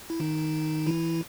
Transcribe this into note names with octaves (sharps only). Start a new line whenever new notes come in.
E4
D#3 D#4
E3 E4